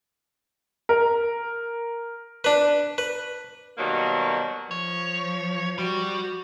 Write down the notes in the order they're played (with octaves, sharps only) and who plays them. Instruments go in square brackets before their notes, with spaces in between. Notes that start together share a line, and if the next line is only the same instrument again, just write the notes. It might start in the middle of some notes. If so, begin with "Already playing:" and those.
[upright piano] A#4
[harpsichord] D4 B4
B4
[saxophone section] B2 D#3 F#3 G3 A#3
[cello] F3 [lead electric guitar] C#5
[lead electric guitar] G3 [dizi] F#4